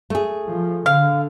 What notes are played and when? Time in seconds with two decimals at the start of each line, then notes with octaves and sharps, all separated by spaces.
0.10 A3 G#4
0.51 F3
0.86 D3 F5